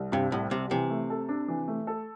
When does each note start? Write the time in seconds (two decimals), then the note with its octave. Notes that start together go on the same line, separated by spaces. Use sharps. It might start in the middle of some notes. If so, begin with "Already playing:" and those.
Already playing: C2
0.12 G2 C3
0.32 C2 A2
0.51 C3 G3
0.71 C3 E3
0.90 A3
1.10 A4
1.29 D4
1.48 E3
1.68 A3
1.87 A4